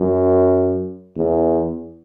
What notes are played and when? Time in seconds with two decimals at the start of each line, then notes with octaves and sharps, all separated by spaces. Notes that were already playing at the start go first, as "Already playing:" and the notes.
Already playing: F#2
1.16 E2